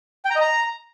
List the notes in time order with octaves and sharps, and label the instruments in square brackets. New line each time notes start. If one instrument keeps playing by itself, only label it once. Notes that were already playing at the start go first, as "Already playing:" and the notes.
[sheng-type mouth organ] G5
A#5
D#5
A#5